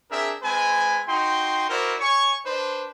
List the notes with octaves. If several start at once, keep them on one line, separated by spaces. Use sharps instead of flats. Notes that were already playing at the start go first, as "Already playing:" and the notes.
C4 D4 G#4 A#4 E5
G#3 C4 B4 G#5
D#4 F#4 G5 C6
E4 F#4 A#4 C5 D5
C#5 G#5 C#6
D4 B4 C5